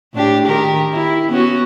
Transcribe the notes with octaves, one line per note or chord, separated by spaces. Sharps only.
A2 D4 G4
D#3 G4 A#4
E4
B3 C#4 F#4